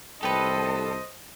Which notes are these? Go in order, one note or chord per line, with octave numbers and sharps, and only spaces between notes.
C2 G4 A4 B4 C5 D#5